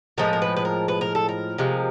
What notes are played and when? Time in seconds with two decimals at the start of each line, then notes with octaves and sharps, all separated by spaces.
0.18 A2 F3 G#3 A#4
0.33 A#4
0.42 B4
0.56 B4
0.65 A#4
0.88 B4
1.01 A#4
1.15 A4
1.29 A#4
1.58 C3 F3 G#3